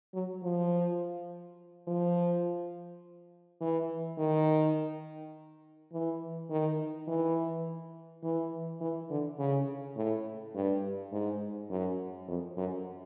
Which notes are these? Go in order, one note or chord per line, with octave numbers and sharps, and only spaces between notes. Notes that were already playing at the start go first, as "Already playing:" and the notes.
F#3
F3
F3
E3
D#3
E3
D#3
E3
E3
E3
D3
C#3
A2
G2
G#2
F#2
F2
F#2